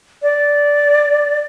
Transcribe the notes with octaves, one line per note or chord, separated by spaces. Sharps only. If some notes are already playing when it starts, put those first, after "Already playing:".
D5